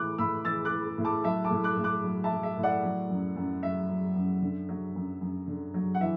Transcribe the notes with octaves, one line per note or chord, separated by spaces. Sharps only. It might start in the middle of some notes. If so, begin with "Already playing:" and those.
Already playing: A2 E3 D6 F#6
A2 B5 E6
E3 E6 A6
D6 F#6
E3
A2
A5 D6
F#3 E5 A5
A5 D6
A2
D6 F#6
A2
D6 F#6
F#3
E5 A5
F#3
E5
A2
D5 F#5
F#3
F#2
F#2
F#3 E5
F#3
F#2
D3
F#3
F#2
F#2
D3
F#3
F#5
E3 E5